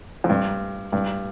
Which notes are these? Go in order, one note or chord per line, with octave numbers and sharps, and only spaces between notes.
F2
G2
G2